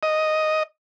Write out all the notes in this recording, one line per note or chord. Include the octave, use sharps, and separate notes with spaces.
D#5